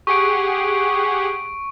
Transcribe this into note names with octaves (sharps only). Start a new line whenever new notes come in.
G4 G#4 F#5 C#6 D7